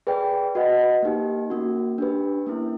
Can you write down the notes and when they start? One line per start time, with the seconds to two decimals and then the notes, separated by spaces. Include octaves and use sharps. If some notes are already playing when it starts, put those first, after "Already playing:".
0.07 G#4 B4 D5 G5
0.55 F#4 B4 D#5 F#5
1.02 A#3 D#4 G4
1.50 A#3 C#4 F#4
1.98 D4 G4 B4
2.47 A#3 C#4 E4